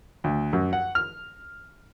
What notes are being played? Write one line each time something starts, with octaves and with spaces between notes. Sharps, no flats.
D2
F#2
F#5
F6